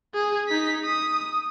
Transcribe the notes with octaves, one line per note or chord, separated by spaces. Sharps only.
G#4
D#4 B6
D#6